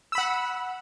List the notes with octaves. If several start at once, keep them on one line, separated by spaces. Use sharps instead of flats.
F#5 B5 E6